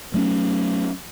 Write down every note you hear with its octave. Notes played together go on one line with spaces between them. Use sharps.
F#3 A3 A#3 C#4